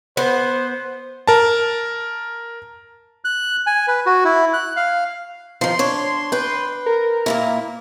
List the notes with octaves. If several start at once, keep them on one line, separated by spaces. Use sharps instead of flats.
B3 C5
A#4 A5
F#6
G#5
B4
F#4
E4
F#6
F5
D#3 F3 C6
D4 C#5
B4 G5
A#4
A#2 A#3 E4